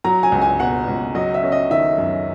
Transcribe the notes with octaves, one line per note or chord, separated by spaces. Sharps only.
F#3 A#5
G#5
C#2
G#5
B2 F#5
C#2
F#3 D#5
E5
C#4
D#5
D#3 E5
F#2